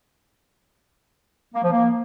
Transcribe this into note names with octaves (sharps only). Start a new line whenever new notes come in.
A#3
F3
A#3